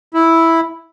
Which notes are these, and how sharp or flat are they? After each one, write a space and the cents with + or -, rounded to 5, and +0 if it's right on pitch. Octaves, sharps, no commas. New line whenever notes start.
E4 -5